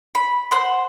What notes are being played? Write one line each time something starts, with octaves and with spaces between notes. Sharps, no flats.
B5
C5 F#5 C6